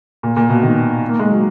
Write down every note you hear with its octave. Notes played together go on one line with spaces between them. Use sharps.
A#2
A#2
B2
D#3
A#3
G#3
F#3